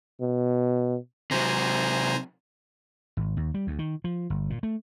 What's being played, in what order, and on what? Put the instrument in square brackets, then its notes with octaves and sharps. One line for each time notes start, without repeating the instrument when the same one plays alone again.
[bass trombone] B2
[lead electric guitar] C3 F#3 [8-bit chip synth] C5 G#5 A#5
[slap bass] G#1
D#2
G3
D2
D#3
F3
G1
A#2
A3